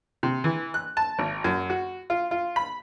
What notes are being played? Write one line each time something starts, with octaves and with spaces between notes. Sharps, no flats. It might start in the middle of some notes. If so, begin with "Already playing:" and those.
C3
E3
F#6
A5
G#1
F#2
F#4
F4
F4
B5